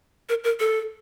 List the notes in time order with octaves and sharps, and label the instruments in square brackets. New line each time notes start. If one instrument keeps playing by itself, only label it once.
[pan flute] A#4
A#4
A4